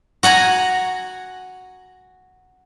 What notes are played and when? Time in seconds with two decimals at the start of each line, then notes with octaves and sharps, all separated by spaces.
0.23 F#4 F#5 G#5 A#5